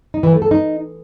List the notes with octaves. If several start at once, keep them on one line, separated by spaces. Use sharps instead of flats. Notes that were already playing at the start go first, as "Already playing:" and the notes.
D#4
E3
A3
A4
D#4